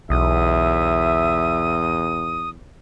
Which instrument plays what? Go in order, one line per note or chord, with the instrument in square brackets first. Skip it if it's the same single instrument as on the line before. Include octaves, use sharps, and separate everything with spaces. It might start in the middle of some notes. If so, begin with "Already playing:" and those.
[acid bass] B1 [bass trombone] E2 [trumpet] E5 [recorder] D#6